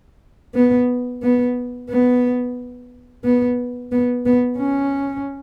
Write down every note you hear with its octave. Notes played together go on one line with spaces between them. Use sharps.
B3
B3
B3
B3
B3
B3
C#4